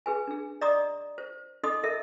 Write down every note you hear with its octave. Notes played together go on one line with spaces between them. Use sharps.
G#4 B4 G#5
D4 G#4
D5 D#5 A#5 C6 D6 D#6
C5
D#4 A4 D#5 C6 D6 D#6
A4 A#4 D#5 E5